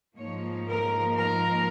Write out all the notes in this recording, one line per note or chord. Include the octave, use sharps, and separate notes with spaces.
G#2 F3 A#3 D#4 C#5
A#4
A#4